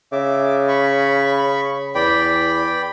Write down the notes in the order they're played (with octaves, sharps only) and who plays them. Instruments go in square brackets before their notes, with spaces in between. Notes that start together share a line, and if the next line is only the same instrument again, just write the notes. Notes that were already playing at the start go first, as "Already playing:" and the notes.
[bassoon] C#3 [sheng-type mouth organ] E5 D6
[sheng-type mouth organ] B5 C#6
[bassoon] E2 [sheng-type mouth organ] D5 G5 B5